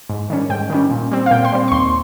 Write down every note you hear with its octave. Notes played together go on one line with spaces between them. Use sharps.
G#2
D#3 G3 C#4
G#2 G5
D#3 G3 C#4
A#2
G3 C4
F5
A#2 G5
C6
G3 C4
C#6
D#2 C6